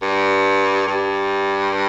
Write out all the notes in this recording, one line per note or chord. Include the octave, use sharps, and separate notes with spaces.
G2
G2